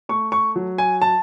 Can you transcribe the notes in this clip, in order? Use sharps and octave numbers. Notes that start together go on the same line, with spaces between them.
A3 C#6
C#6
F#3
G#5
A5